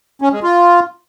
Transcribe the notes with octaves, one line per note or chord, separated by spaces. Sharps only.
C#4
G#3
F4